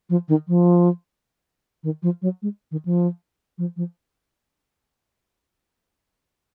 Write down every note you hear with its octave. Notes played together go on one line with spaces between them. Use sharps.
F3
D#3
F3
D#3
F3
F#3
G#3
D#3
F3
F3
F3